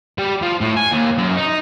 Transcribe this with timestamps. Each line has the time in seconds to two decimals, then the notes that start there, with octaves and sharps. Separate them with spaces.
0.18 G3
0.42 F3
0.61 A2
0.77 G#5
0.92 D#2
1.18 F#2
1.37 D#4